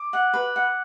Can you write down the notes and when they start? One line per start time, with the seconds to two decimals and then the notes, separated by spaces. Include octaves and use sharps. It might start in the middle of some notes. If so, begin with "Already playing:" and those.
Already playing: D6
0.13 F#5
0.34 B4
0.56 F#5